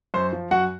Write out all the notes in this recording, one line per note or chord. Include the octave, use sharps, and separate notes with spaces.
F#2 C5
F3
F#2 F#4 F#5